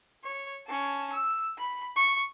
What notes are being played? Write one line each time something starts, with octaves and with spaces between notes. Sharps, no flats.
C#5
C#4 A5
E6
B5
C#6